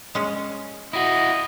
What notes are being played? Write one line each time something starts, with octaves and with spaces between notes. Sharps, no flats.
G#3 C#4
E4 F#4 D#5